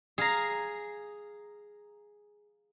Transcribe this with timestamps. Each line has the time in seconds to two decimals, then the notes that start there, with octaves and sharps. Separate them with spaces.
0.18 G#4 F5 A#5